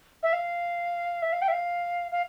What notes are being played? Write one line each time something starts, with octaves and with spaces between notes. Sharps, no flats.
E5
F5
E5
F5
G5
E5
F5
F5